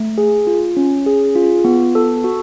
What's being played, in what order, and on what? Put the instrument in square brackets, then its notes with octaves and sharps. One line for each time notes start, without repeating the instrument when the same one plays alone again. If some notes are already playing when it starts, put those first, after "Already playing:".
Already playing: [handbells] A3
G#4
F4
C#4
G#4
F4
B3
A4
F#4